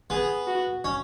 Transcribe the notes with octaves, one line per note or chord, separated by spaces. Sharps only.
B3 G#4
F#4
C#4